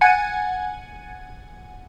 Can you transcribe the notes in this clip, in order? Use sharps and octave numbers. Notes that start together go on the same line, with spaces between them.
F#5 G#5 G#6 A6 C#7 D#7